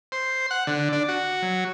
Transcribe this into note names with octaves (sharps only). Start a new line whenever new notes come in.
C5
F#5
D3
D4
F#4
F#3